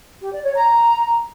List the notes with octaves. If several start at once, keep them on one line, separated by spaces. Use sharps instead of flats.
G4
D5
C#5
A#5